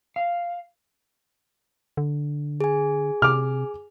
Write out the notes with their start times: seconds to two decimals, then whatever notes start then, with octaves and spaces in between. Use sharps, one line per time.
0.16 F5
1.97 D3
2.60 G#4 G#5
3.22 C3 D6 F6